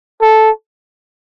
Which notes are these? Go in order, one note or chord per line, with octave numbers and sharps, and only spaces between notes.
A4